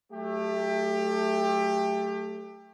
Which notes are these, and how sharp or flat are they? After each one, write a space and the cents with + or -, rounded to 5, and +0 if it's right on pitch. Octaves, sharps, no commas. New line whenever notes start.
F#3 +10 A3 +0 G4 +25